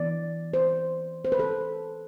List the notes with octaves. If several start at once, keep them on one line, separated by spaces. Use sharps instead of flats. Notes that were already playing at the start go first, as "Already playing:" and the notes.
Already playing: E3 B3 D5
C5
C5
B4
A4